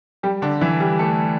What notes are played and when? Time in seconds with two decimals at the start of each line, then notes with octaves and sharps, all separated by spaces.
0.23 G3 G4
0.42 D3 D4
0.61 E3 E4
0.80 G3 G4
0.99 A3 A4